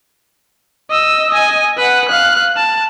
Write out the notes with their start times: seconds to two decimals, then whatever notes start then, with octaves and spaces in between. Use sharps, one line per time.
0.91 D#5 E6
1.30 D#5 G#5
1.77 B4 F#5
2.08 F5 F#6
2.57 A5